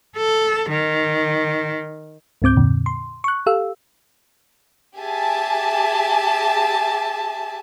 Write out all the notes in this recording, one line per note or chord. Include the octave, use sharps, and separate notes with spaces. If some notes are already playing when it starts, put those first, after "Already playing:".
A4
D#3
C#2 G#2 C4 D6 G6
F2 A#2 D3
C6
C#6 F#6
G4 A4 F5 E6
G4 G#4 E5 G#5 A5